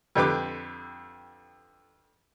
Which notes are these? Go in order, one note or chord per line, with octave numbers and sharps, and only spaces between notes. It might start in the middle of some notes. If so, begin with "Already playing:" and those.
F2 D3 G4 B4 D6